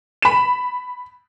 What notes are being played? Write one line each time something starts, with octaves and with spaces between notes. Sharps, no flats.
B5 E7